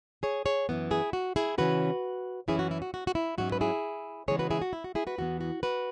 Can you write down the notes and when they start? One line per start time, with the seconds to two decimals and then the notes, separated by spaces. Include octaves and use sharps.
0.23 G#4 C#5
0.45 G#4 C#5
0.69 F#2 E3 B3
0.91 E4 G#4
1.13 F#4
1.36 E4 G#4
1.58 C#3 E3 C#4 F#4 B4
2.48 F#2 E3 C#4 E4 G#4
2.59 F#4
2.71 E4
2.82 F#4
2.94 F#4
3.07 F#4
3.15 E4
3.38 G#2 F#3 C#4 F#4
3.52 B4
3.61 E4 G#4
4.28 C#3 E3 G#3 B3 G#4 C#5
4.39 F#4 B4
4.51 E4 G#4
4.62 F#4
4.73 E4
4.84 F#4
4.95 E4 G#4
5.07 F#4 B4
5.18 E2 E3 B3 F#4
5.41 F#4
5.63 F#4 B4